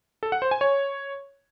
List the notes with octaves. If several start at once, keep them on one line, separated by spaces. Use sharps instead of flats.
A4
F#5
C5
G#5
C#5